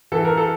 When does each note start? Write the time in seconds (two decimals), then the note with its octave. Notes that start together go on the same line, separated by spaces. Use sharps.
0.12 E3 A4
0.25 A#4
0.37 A4